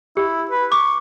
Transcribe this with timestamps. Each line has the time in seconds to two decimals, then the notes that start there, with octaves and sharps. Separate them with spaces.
0.17 E4 G4
0.51 B4
0.72 C#6 D6